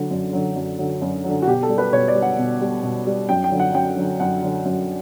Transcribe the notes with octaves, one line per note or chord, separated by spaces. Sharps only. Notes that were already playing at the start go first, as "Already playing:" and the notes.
Already playing: D3 F#3
F#2
D3 F#3
F#2
D3 F#3
F#2
D3 F#3
F#4
B2 G4
A4
G3
B4
B2 C#5
D5
G3
F#5
B2
G3
B2
G3
F#2 G5
G5
D3 F#3
F#5
F#2 G5
D3 F#3
F#2 F#5
D3 F#3
F#2